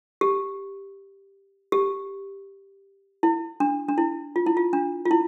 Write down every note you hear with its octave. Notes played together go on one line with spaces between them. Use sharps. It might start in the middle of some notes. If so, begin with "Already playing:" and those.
G4
G4
E4
D4
D4
E4
F4
E4
F4
D4
F4
E4